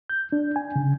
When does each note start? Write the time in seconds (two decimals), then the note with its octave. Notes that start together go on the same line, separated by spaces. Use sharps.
0.10 G6
0.32 D4
0.56 G#5
0.76 C#3